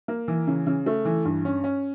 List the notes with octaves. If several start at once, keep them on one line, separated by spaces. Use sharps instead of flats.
A#3
E3
C#3
C#3
A3
E3
G2
C#4
C#4